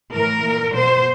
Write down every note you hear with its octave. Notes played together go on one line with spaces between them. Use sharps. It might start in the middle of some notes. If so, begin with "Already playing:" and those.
A2 E3 A#4
A#2
B2 C5